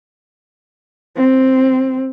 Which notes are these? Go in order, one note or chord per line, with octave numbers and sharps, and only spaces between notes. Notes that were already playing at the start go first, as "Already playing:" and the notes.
C4